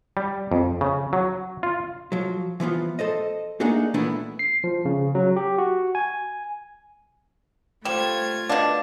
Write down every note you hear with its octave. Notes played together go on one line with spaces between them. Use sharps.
G3
F2
C#3
F#3
F4
F3 F#3
E3 F3 B3 F4
A4 C5 D#5
A3 A#3 D4 D#4 G#4 F#5
A#2 E3 A3 B3 D4 E4
C7
F3
C#3
F#3
G4
F#4
G#5
G3 A3 F4 C5 G#6 E7
B2 D4 D#5 F5 F#5